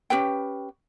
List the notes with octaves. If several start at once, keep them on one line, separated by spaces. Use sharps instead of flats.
C#4 G4 B4 G5